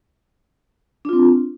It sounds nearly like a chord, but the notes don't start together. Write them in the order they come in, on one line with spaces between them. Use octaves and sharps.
D4 F4 C4